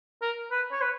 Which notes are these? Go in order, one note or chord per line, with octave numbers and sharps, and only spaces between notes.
A#4
B4
C#5
B4